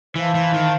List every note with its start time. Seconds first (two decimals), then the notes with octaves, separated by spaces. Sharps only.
0.16 E3 C5 F5 A5
0.35 E3
0.54 D#3